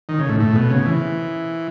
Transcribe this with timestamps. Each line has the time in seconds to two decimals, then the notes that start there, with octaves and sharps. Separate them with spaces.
0.09 D#3
0.19 C#3
0.29 A2
0.40 A2
0.55 B2
0.70 C#3
0.86 E3